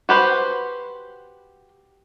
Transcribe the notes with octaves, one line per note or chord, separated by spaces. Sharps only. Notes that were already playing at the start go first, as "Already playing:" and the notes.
F#4 G4 B4 C5